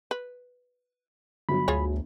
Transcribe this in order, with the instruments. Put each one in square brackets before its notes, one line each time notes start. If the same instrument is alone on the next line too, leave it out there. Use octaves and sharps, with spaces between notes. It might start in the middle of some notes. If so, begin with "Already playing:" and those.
[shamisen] B4
[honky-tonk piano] G1 F#3 [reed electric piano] B5
[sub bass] D2 [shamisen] F4 G#4 C#5